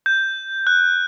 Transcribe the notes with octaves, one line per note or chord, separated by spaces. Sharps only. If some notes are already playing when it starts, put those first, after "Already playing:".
G6
F#6